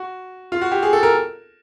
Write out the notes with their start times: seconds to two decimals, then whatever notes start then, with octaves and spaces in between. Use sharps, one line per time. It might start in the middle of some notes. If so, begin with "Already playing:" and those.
Already playing: F#4
0.52 F4
0.61 F#4
0.72 G4
0.82 G#4
0.93 A4
1.03 A#4